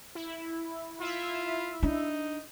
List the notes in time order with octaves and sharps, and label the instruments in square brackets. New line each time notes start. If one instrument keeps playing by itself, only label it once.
[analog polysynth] E4
[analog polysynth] E4 E5 [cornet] F4
[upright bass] D4 [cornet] D#4